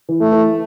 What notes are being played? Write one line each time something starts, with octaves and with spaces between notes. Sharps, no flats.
E3
A3
E3